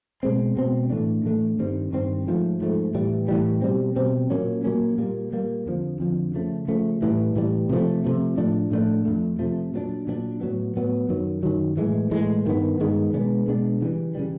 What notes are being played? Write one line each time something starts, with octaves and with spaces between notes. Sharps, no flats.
B2 G#3 C4
B2 G#3 C4
A2 E3 A3 D4
A2 E3 A3 D4
G2 D#3 G3 C4
G2 D#3 G3 C4
G#2 F3 A3
G#2 F3 A3
A2 E3 G3
A2 E3 G3
B2 G3 C4
B2 G3 C4
A#2 F#3 A#3 C#4
A#2 F#3 A#3 C#4
A#2 G3 A#3
A#2 G3 A#3
F2 D3 F3
F2 D3 F3
C#3 F3 A3
C#3 F3 A3
A2 E3 G3
A2 E3 G3
C3 F3 A3
C3 F3 A3
A2 F3 A3 D4
A2 F3 A3 D4
F2 C3 F3 A3
F2 C3 F3 A3
A#2 F#3 B3 D4
A#2 F#3 B3 D4
A2 F#3 B3
A2 F#3 B3
F#2 D#3 F#3
F#2 D#3 F#3
A2 E3 G#3
A2 E3 G#3
G2 D#3 G#3 B3
G2 D#3 G#3 B3
B2 G#3 B3 D4
B2 G#3 B3 D4
C#3 E3 G3
C#3 E3 G3